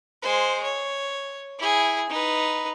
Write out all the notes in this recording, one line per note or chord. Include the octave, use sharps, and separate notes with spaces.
G#3 C5
C#5
E4 G#4
D#4 B4